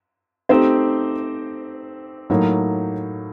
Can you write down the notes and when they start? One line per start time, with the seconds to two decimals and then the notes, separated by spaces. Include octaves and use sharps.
0.49 A3 C4 D#4 G4 C5
2.30 A2 F#3 A#3 D#4